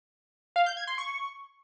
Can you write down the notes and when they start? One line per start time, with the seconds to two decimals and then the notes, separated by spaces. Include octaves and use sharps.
0.56 F5
0.66 G6
0.77 G#6
0.87 C6
0.98 C#6